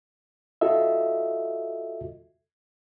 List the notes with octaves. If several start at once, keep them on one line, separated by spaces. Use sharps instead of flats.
F4 F#4 A4 D#5 E5